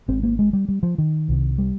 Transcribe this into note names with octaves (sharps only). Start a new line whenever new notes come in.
G#1 G#2 C4
A#3
G#3
G3
G3
F3
D#3
C2 C3
G3